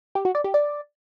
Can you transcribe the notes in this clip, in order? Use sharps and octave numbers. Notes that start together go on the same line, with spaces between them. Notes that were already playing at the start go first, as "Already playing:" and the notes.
G4
F#4
D5
G4
D5